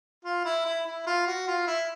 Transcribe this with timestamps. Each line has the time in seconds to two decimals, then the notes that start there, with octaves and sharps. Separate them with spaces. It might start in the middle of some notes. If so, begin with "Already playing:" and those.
0.24 F4
0.45 E4
0.65 E4
0.86 E4
1.06 F4
1.27 F#4
1.47 F4
1.67 E4